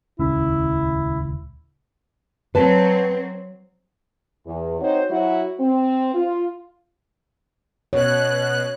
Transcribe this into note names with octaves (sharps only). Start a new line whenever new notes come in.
D#1 C#2 C#4 E4
F#3 C4 B4 A5
E2
C4 D#4 F#4 C5 C#5
F#3 E4 F#4
C4
F4
B2 C#5 F#6